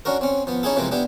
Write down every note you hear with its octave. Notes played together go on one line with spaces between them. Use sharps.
C#4 D4 F#4 A#4
C4 C#4
F3 B3
C#4 D#4 E4 G#4 A4
C3 E3 F3 G#3 A#3 C4
B3 D4 E4 G4